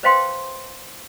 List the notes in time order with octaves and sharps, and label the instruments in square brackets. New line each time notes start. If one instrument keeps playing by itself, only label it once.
[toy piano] B4 C5 D#5 F5 G5 C6